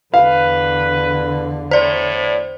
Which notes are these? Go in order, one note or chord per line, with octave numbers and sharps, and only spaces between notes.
E2 D3 B4 F5
A2 C5 D5